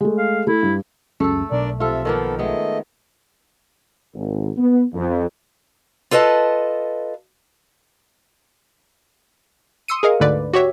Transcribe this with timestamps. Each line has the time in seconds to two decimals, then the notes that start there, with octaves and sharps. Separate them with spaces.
0.01 G#3 A3
0.18 F5
0.47 A3 E4
0.63 G2
1.20 C#2 F#2 C#3 A3 A4
1.51 B1 D4 A#4 D5
1.80 C3 F3 F4 A4 E5
2.05 D#3 F3 A#3 B3 A4
2.39 G#3 A3 B3 D#5
4.14 G#1
4.57 B3
4.94 F2
6.11 F4 A4 B4 D#5 A5
9.88 C6 D#6 E6 C#7 D#7
10.03 G#4 A#4 D#5 F5
10.20 D2 G#2 D3 B4 D5
10.53 F#4 G4 C#5 E5